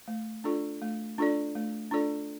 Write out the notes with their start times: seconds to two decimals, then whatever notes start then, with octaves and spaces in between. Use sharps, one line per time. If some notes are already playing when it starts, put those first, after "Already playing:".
0.08 A3
0.44 D4 F4 A4 D5
0.82 A3
1.18 D4 F4 A4 D5
1.55 A3
1.91 D4 F4 A4 D5